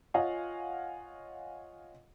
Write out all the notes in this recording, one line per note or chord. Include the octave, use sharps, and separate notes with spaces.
F4 C#5 D#5 F5 F#5 G#5